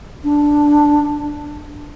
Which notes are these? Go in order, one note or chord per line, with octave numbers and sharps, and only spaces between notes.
D4